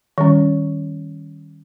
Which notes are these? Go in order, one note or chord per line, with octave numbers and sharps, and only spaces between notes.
D#3 G3 C#4